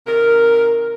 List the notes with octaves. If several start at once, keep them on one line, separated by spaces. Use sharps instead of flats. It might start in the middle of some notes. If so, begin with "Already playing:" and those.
C3 D#3 A#4